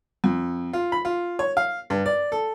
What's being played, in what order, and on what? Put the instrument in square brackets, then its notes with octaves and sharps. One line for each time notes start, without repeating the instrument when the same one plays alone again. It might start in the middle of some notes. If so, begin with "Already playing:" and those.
[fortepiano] F2
F4
B5
F4
C#5
F5
G2
D5
A4